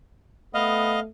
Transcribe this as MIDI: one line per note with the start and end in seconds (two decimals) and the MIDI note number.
0.54 1.08 57
0.54 0.99 59
0.54 1.00 75
0.54 1.00 77